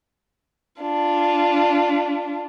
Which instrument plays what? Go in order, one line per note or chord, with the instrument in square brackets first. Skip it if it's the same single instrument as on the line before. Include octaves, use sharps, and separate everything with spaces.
[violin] D4 F4